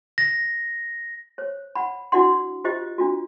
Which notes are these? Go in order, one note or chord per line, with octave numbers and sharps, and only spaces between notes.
A#6
C5 C#5
F#5 B5
D4 E4 F#4 D5 F#5 C6
F4 G4 C5 D#5
D4 F4 F#4